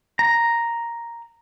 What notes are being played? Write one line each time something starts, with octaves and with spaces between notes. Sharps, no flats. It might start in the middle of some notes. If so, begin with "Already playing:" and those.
A#5